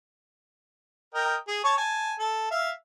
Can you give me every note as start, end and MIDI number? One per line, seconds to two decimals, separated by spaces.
1.15 1.36 70
1.15 1.36 75
1.15 1.36 79
1.48 1.62 68
1.64 1.75 73
1.64 1.75 81
1.64 1.75 85
1.77 2.15 80
1.77 2.15 81
2.19 2.51 69
2.51 2.71 76
2.51 2.71 77